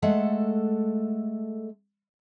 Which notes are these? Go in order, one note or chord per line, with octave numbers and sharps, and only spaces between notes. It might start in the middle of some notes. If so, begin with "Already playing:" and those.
G#3 A3 A4 F#5 A5